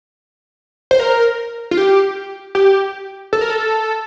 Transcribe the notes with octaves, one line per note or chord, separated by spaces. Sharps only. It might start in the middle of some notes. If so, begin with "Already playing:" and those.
C5
A#4
F4
G4
G4
A4
A#4
A4